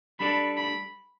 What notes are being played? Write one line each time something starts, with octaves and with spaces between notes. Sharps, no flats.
G3 D4 A4 D5 B5
B5